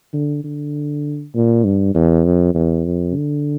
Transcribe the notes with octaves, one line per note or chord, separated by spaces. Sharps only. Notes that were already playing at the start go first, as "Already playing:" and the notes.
D3
D3
A#2
G2
E2
F2
E2
F2
D3